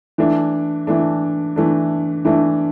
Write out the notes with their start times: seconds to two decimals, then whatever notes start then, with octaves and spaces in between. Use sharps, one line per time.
0.18 E3 A3 D4
0.87 E3 A3 D4
1.56 E3 A3 D4
2.25 E3 A3 D4